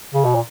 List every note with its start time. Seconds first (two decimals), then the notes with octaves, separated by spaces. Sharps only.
0.14 C#3
0.25 B2
0.35 A#2